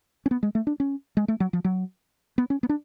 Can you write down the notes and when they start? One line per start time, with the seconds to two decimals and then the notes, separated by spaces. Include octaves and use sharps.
0.26 C#4
0.31 B3
0.43 G#3
0.55 A3
0.67 D4
0.80 C#4
1.17 G#3
1.28 A3
1.40 F#3
1.53 F3
1.64 F#3
2.38 B3
2.50 C#4
2.63 B3
2.69 D4